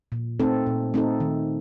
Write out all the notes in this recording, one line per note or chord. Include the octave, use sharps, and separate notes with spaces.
A#2
A3 C4 D#4 A4
A#2
A3 C4 D#4 A4
D#3